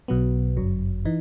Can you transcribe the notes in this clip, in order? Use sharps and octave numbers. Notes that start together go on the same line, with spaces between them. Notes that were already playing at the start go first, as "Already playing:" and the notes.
B1 B2 F#3 B3
G1 F#2 F#3
E3 D#4